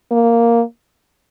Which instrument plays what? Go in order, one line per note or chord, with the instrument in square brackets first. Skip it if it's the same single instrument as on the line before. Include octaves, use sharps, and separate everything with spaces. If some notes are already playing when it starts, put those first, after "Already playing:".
[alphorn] A#3